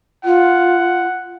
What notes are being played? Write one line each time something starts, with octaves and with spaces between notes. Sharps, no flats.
F4 F#5